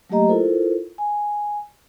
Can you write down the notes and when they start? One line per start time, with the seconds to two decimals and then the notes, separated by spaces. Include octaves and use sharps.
0.10 F#3 A3 A#3 G4 D#5 A#5
0.28 E4 F4 A4 A#4 C5
0.98 G#5